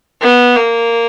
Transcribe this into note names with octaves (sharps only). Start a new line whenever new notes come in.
B3
A#3